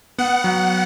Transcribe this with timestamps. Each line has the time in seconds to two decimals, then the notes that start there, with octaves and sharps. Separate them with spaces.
0.18 B3 F#5
0.44 F#3